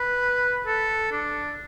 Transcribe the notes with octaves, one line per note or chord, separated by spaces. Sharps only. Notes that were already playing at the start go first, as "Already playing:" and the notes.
Already playing: B4
A4
D4